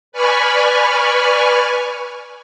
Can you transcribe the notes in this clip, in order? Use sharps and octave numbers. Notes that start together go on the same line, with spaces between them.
B4 D5 G#5 B5 C#6 F6